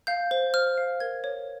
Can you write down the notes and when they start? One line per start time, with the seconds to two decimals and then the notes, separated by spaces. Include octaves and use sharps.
0.07 F5 G6
0.31 C5
0.54 C5 F6
0.78 F5
1.00 A#4 G#6
1.24 C#5